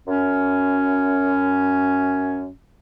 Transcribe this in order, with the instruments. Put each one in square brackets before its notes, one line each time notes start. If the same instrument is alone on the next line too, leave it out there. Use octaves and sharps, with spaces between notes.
[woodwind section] F#2 C#4